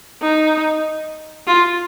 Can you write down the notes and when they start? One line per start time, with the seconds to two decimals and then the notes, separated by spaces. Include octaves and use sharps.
0.22 D#4
1.47 F4